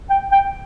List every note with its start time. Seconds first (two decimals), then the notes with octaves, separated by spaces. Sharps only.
0.10 G5
0.32 G5